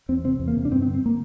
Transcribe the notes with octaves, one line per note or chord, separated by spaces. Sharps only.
E2 C4
C3 C4
E2
A#3
C3
D4
G2 C4
C4
D3
C4
A#3